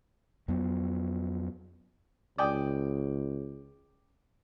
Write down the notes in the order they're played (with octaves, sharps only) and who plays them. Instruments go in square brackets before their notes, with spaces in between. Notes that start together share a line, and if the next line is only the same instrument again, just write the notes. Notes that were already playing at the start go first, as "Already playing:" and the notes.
[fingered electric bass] F2 F#3 B3
[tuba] C#2 [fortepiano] D5 G5 D#6